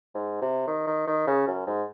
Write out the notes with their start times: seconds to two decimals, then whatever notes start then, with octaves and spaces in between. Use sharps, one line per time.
0.15 G#2
0.41 C3
0.67 D#3
0.87 D#3
1.07 D#3
1.27 C#3
1.47 F#2
1.67 G#2